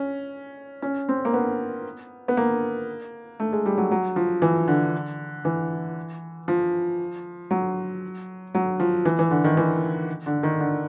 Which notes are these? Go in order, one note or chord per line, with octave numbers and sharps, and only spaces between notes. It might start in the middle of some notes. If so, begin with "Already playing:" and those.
Already playing: C#4
C#4
C4
A#3
B3
B3
A#3
A3
G#3
G3
F#3
F#3
F3
E3
D3
E3
F3
F#3
F#3
F3
E3
E3
D3
D#3
E3
D3
D#3
D3